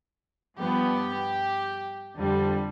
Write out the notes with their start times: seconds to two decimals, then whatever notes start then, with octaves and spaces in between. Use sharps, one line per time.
0.57 G2 F3 B3 G4
2.17 F2 D3 G3